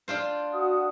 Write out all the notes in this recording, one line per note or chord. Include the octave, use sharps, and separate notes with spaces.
D4 F4 C5
F#4 F#5 D#6